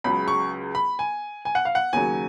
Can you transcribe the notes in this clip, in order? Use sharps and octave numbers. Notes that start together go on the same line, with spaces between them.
C#2 C#3 F#3 B5
C#6
B5
G#5
G#5
F#5
F5
F#5
D#2 C#3 F#3 G#5